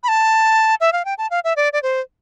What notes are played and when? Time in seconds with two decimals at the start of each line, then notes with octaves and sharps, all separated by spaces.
0.03 B5
0.08 A5
0.81 E5
0.93 F5
1.05 G5
1.18 A5
1.31 F5
1.44 E5
1.56 D5
1.73 D5
1.83 C5